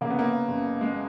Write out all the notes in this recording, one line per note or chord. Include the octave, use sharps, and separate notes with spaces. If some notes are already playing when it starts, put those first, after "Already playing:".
C#3 A#3
B3
A#3
F#1
G#3